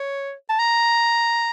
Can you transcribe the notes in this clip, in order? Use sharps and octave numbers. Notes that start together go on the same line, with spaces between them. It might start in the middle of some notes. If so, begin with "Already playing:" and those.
Already playing: C#5
A5
A#5